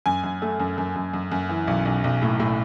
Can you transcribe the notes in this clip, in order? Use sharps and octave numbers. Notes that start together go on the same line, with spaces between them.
F#2 G#5
F#2
A3
F#2
F#2
F#2
F#2
F#2
E3
B1
B1
B1
A2
A2